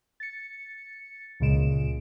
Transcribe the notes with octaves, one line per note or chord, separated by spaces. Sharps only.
A6 C#7
C#2 A#2 C#3 G#3 D7 E7